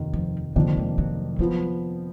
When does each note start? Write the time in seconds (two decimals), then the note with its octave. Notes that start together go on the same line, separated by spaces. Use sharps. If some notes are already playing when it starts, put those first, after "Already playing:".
Already playing: F1 D#2 D#3
0.14 F3
0.55 F1 F2 D3 D#3 A#3 D4
0.77 G#3
0.98 F#3
1.39 F3 F#3 B3